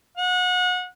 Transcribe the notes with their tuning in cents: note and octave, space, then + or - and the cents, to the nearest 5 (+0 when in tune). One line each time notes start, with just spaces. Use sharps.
F#5 -30